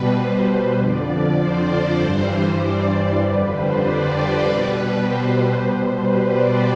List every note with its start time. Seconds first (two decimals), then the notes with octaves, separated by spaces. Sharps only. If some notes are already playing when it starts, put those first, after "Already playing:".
Already playing: B2 G3 B4
0.12 C5
0.74 F2 D3 F3 D5
1.35 C5
1.66 D5
1.97 G2 E3 G3 C5
2.58 D5
2.89 C5
3.19 F2 D3 G3 B4
3.50 C5
3.81 D5
4.42 B2 G3 B4
5.03 C5
5.64 B2 G3 C5
5.95 B4
6.26 D5